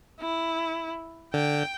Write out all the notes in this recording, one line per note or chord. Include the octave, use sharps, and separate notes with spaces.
E4
D3 G5